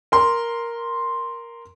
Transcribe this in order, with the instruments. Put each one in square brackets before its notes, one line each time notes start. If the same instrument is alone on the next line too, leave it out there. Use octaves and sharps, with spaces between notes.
[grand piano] A#4 C6